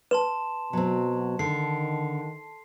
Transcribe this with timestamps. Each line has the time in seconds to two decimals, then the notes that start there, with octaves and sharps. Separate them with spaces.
0.11 B4 A5 C6 E7
0.73 B2 F#3 C4
1.39 D3 D#3 C7